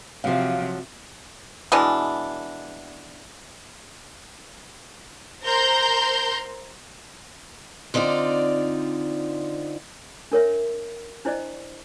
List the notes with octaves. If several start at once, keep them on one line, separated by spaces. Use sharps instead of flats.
C3 F3 F#3 F5
B2 E3 G#3 D4
A#4 C5 A#5 C6 G6
D3 C4 D#4 F4 D5
D4 A#4 C#5 E5
D4 E4 C5 D5 D#5